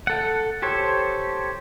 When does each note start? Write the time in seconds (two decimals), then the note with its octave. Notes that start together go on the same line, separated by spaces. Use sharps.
0.07 A4 F#5
0.62 G4 A4 C5 C#5